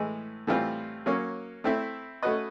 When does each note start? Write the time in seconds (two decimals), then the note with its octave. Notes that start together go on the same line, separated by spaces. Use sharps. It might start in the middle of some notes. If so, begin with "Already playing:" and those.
Already playing: A2 E3 G#3
0.47 A2 E3 G3 C4 F4
1.06 F#3 A#3 C#4
1.64 A3 C4 E4
2.23 A3 C#4 F#4 B4 D#5